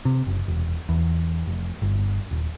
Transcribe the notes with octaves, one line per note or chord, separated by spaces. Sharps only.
C3
F#1
E1
E2
F1
G1
D#1